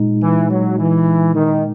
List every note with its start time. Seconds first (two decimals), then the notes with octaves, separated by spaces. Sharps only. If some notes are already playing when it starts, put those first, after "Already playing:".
Already playing: A#2 G#3 D#4
0.22 E3
0.50 F#3
0.78 E3
1.34 D#3